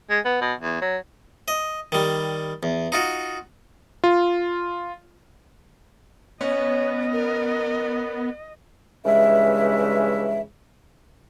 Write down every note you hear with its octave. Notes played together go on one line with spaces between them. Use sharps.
G#3
B3
B2
E2
F#3
D#5
D#3 G3
E2
D#4 F4 F#4
F4
B3 C#4 C#5 D#5
A#4
G2 C#3 E3 G#3 E5